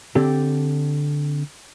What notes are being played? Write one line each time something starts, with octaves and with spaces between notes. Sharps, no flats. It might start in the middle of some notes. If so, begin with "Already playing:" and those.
D3 C4 D4 G4 A4